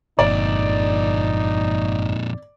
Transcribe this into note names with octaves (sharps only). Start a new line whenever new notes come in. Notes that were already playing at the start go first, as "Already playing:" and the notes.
G1 F2 A#2 D#4 D5